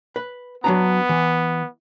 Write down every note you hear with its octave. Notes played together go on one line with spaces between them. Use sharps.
B4
F#3 B3 D4 A#5
E3